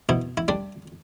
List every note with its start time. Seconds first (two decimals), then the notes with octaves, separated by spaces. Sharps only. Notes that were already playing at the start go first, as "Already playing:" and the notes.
0.09 B2 E4
0.37 E4
0.48 G3 D4